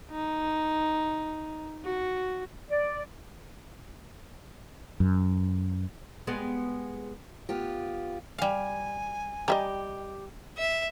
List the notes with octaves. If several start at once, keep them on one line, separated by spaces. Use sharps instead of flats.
D#4
F#4
D5
F#2
G3 G#3 B3
B3 F4 G4
G3 F5 G#5
G3 G4 D#5 E5 A#5
E5